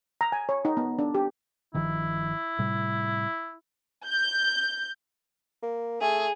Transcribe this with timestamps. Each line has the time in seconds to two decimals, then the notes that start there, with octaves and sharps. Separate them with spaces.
0.21 A#5
0.32 G#5
0.49 C#5
0.65 D#4
0.77 B3
0.99 D4
1.14 G4
1.74 G1 D#3 F3 E4
2.59 A2 C3 G3
4.07 G6
5.62 A#3
6.01 A3 G#4